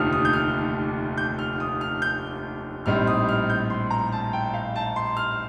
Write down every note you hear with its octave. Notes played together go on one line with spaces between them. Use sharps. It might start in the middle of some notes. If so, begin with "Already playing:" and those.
Already playing: F1 D#2 D3 F3 A3 D#6 F6
D#6
G6
F6
G6
F6
D#6
F6
G6
A#1 A2 G3 C4 D#4 F6
D#6
F6
G6
C6
A#5
A5
G5
F5
A5
C6
F6